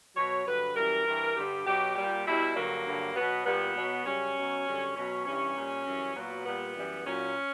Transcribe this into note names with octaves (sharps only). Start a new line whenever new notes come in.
B2 F#3 C#5
G2 D3 F#3 B4
F#2 E3 G3 A#4
G2 E3 G3
G2 D3 G3 G4
B2 F#3 G4
A#2 G3 G4
B2 G3 E4
G2 D3 F#3 A#3
G2 D3 F#3
B2 F#3 B3
A#2 G3 B3
B2 F#3
F#2 C#3 G3 C#4
B2 F#3
F#2 D3 G3
B2 F#3 C#4
G2 E3 G3 C#4
A#2 G3
F#2 E3 G3
A#2 F#3 B3
A#2 G3 B3
F#2 E3 G3
A#2 F#3 C#4